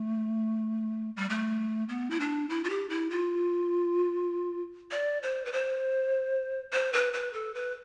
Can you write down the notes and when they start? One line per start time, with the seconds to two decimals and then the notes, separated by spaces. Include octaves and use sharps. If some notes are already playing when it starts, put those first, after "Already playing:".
Already playing: A3
1.17 G3
1.30 A3
1.89 B3
2.10 E4
2.20 D4
2.49 E4
2.64 F4
2.70 G4
2.90 E4
3.11 F4
4.91 D5
5.23 C5
5.45 B4
5.52 C5
6.73 C5
6.93 B4
7.13 B4
7.33 A4
7.55 B4